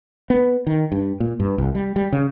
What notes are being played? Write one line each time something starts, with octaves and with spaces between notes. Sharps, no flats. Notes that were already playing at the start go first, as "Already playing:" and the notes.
B3
D#3
G2
A#2
G2
C2
G3
G3
C#3